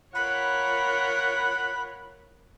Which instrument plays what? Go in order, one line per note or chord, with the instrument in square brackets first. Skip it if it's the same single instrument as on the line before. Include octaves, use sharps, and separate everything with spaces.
[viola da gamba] F4 A#4 C#5 [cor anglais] F#5 [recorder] B5